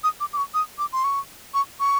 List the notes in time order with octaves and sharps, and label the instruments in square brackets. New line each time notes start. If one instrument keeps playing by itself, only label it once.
[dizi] D#6
D6
D6
C#6
D#6
D6
C6
C#6
C#6
C#6